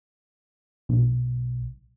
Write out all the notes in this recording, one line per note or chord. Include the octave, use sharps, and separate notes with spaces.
B1